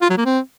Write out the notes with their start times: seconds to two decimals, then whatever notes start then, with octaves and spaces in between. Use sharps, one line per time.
0.02 F4
0.10 F#3
0.18 A#3
0.25 C4